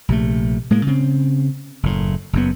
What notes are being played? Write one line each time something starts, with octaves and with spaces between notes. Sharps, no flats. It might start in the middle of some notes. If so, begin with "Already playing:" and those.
A#1 C3 A3
A2 G#3 A#3
C#3 C4
F#1 A2
F#1 F#2 B3